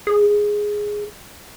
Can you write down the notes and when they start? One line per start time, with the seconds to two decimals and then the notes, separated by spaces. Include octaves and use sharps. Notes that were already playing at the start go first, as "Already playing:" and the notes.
0.07 G#4